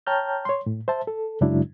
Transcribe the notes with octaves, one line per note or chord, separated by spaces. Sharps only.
C#5 G5 A5 A#5 F6 G6
C#5 C6
A2
C5 E5 A5
A4
F#2 C#3 F#3 G#3 D4 E4